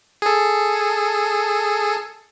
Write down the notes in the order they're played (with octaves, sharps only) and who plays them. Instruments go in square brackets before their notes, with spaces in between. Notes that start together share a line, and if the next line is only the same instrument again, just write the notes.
[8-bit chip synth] G#4 A4